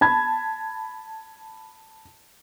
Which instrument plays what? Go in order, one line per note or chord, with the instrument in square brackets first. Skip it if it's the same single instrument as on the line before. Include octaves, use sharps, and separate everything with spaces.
[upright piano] A5 B5 G#6